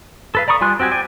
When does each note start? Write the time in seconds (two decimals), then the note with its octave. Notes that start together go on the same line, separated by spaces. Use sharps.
0.35 A4 B4 F5
0.48 D5 A#5 B5 C#6 D#6
0.61 G3 F4 G#5 C6 F#6
0.80 C4 F#4 G4 G#5
0.91 D5 G5 G#5